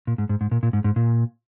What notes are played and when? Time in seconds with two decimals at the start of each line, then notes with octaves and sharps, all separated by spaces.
0.07 A#2
0.18 G#2
0.29 G#2
0.41 G#2
0.51 A#2
0.63 A#2
0.73 G#2
0.84 G#2
0.96 A#2